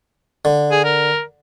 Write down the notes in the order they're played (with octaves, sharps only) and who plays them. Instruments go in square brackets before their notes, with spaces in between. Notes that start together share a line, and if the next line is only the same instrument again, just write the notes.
[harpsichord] D3
[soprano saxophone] G#4
A#4